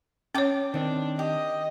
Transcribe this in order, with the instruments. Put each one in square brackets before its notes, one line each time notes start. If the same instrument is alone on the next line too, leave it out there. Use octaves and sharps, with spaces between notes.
[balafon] C#4 C#5 [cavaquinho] G5 D6
[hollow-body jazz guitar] D#3 C4 [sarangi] D4
[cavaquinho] G4 [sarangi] D#5